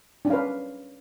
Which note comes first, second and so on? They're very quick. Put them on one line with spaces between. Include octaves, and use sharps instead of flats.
D4 C#4 F5 B4